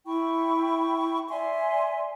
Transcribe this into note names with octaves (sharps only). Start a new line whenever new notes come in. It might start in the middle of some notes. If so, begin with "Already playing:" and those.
E4 G5 B5 C#6
D5 E5 G#5 C6